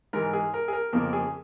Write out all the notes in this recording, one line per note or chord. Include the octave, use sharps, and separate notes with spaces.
G#2 E3 G#3 A#4
G#4
A#4
G#4
A#4
F2 C#3 F3 A#3 A#4
G#4